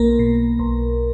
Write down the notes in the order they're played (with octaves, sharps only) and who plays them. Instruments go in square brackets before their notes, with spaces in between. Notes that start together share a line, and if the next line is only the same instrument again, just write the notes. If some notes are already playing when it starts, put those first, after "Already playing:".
Already playing: [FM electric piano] B1 A#3 A#4
B2
B1